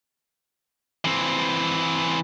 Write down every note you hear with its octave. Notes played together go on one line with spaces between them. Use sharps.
E3 C4